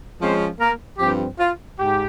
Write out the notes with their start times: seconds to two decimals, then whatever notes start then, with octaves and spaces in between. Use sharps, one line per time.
0.21 F3 G#3 C4 C#4 F4 C5
0.60 A#3 A#4
0.99 G2 F3 C4 G4
1.39 F4
1.78 G#2 G4